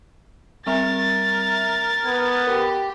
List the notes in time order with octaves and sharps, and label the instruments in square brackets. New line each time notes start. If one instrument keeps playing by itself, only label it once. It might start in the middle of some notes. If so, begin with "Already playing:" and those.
[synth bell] G3 C4 E5 [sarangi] A#4 [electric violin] A6
[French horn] B3 [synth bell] G#6
[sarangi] G4 [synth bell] A#4